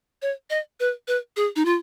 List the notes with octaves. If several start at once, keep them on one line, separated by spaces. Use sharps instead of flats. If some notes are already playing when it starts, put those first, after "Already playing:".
C#5
D#5
B4
B4
G#4
D#4
F4